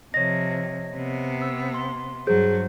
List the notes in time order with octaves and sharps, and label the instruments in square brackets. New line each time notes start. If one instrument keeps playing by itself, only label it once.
[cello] C3 F3 [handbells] C#5 D#5 [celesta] A#6
[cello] C3 B3
[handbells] E6
C6
[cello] G2 F#3 [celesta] G#4 [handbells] C5